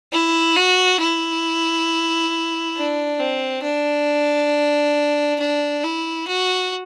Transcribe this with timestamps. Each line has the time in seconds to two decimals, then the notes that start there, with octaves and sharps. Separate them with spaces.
0.12 E4
0.56 F#4
1.00 E4
2.76 D4
3.19 C4
3.63 D4
5.39 D4
5.83 E4
6.28 F#4